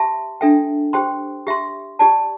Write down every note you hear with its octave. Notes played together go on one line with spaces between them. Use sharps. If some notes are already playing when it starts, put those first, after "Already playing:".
Already playing: G4 E5 A5 C6
D4 A4 E5 G5
G4 C5 G5 C6
G4 E5 C6
G4 D5 A5